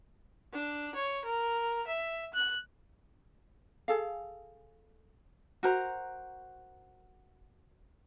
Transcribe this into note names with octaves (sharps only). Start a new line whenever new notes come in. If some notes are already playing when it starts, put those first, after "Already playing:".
D4
C#5
A#4
E5
F#6
G#4 A4 F5
F#4 A#4 C5 A#5